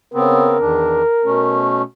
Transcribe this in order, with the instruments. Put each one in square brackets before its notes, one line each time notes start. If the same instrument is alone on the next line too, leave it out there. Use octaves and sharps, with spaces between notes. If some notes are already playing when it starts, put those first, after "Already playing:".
[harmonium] C#3 B3 C4 [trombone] A#4
[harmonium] E2 D#3 D4
B2 A3 C#4